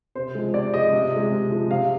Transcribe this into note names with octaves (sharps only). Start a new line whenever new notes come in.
C3 C5
F3 G#3
C3 D5
F3 G#3 D#5
C3
F3 G#3
C3
F3 G#3
C3 F5